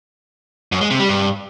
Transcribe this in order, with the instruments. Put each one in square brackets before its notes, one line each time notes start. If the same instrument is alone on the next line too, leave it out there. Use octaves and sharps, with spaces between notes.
[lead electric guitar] F#2
G#3
C3
G3
G2